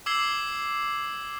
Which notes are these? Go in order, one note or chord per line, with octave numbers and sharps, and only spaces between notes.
D6 E6 G#6 C7 G7